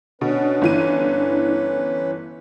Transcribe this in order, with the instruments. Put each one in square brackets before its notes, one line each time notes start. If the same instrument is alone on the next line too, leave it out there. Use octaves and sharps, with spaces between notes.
[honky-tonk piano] B2 [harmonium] C#4 B4 [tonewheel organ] D4
[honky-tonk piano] G1 E3 D#7